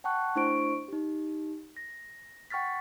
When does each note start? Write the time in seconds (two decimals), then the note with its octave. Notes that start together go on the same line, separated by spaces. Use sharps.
0.04 F#5 G5 A5 C#6 F#6
0.35 A3 D4 E4 C5 C#6 D7
0.88 D#4 G4
1.77 A#6
2.50 F#5 G5 C#6 F6 A6 B6